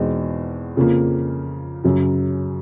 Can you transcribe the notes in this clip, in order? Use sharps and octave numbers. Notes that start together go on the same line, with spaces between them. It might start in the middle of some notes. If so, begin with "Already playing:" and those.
Already playing: E2 B2 G#3 C4 D#4
F2 C#3 F3 A#3
F#2 C#3 F#3